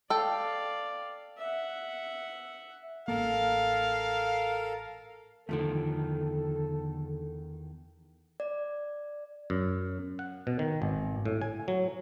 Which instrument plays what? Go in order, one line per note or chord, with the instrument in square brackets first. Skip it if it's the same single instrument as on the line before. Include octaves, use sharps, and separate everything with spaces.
[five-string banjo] A4 G5 [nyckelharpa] D5 F5
[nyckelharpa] E5 F#5
[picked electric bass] A1 A#3 [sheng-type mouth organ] A4 A#4 [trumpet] F5
[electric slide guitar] E2 D#3 [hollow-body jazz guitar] D3 F3 A3 [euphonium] A4
[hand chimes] D5
[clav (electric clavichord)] F#2
F#5
B2
D#3
G#1
A2
G#5
F#3